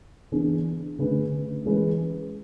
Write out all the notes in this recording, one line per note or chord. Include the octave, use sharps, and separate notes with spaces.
E3 B3 D4 G#4
D3 A3 C#4 G#4 B4
E3 G#3 C#4 G#4 B4